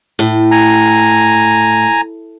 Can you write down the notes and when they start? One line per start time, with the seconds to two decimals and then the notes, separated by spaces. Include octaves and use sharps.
0.19 A2
0.51 G#5 A#5